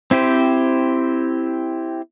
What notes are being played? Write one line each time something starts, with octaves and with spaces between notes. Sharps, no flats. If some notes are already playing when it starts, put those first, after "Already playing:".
C4 E4 G4 C5